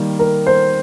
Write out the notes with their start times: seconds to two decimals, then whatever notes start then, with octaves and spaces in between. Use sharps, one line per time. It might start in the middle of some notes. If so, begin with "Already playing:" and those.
Already playing: D#3 G3 A#3
0.19 A#4
0.47 C5